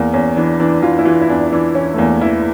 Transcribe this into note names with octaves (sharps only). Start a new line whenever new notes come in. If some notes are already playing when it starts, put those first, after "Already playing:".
Already playing: E2 A#3
E2 C#4
E3 D4
E3 D4
E3 F4
E4
E3 F4
E4
E2 D4
E3 D4
E3 C#4
A3
E2 A#3
E3 E4